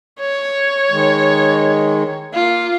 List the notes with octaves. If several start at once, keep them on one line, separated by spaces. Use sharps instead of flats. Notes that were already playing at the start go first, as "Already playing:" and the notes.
C#5
D#3 G#3
A#3 F4